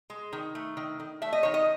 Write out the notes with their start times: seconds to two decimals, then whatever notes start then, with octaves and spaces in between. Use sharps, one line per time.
0.10 G#3
0.33 D#3
0.55 A3
0.77 D#3
1.00 D#3
1.22 A3 E5
1.33 D#5
1.43 D#3 C#5
1.54 D#5